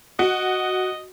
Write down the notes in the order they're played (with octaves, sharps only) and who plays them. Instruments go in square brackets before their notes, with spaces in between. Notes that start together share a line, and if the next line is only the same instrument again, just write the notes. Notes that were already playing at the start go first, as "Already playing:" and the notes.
[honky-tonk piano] F#4 [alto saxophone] D#5